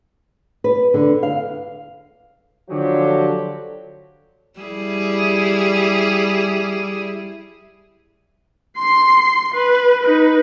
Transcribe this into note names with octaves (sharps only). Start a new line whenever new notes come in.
B4
D3
F5
D3 F3 F#3 G4
G3 E4 G#4
C6 C7
B4
D#4 B4